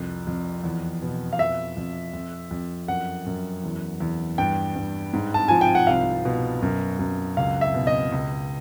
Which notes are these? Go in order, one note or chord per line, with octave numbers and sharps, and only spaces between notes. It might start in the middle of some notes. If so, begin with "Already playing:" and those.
Already playing: C2 F2
F2
E2
B2
F5
F2 E5
F2
F2
F2
F#2 F#5
F#2
E2
E2
G2 G5
G2
G#2
A5
F3 G#5
G5
F#5
C2 F5
B2
F#2
F#2
C#2 F5
E5
B2
D#5
C#2